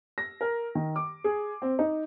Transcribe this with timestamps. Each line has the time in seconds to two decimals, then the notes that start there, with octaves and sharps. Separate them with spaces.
0.18 A#6
0.41 A#4
0.75 D#3
0.96 D6
1.24 G#4
1.62 C4
1.79 D#4